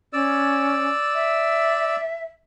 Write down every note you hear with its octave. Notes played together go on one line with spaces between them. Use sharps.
C#4 D5 E6
E5